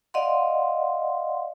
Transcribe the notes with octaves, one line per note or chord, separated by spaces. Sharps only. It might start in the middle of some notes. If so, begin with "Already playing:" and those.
D5 D#5 F5 F#5 C6